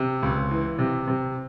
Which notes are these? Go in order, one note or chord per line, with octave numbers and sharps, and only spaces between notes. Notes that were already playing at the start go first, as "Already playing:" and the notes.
Already playing: C3
C#2
E3
C3
C3